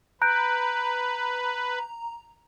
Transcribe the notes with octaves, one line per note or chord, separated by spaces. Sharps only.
B4 A#5 F#6 G6 D7